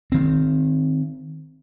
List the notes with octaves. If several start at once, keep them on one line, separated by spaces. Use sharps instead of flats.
D#3 C4